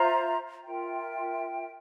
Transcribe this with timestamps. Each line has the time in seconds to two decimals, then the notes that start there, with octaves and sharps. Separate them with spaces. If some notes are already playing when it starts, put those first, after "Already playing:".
Already playing: F4 C5 E5 A#5
0.64 F4 A#4 E5 G5